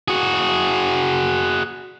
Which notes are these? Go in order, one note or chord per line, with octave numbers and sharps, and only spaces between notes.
F#4 G#4